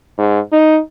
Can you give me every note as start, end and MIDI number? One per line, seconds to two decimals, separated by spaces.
0.18 0.39 44
0.52 0.79 63